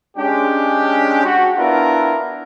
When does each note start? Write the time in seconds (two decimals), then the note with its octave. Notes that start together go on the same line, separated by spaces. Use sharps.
0.17 G#3 C#4 D4 G4
1.25 F#4
1.57 B3 D4 E4 F4 A#4